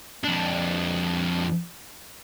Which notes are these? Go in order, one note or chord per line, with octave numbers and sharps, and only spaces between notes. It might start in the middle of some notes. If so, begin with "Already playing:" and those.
F2 D4